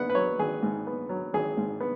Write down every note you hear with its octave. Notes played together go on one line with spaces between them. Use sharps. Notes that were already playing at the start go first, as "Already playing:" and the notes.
Already playing: B3 F#5
B4
F#3 C#5
G#1 G#4
G#2
B3
F#3
G#1 G#4
G#2
B3